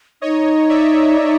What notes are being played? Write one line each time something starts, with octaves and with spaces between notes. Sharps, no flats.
D#4 C#5 D#5
D5 E5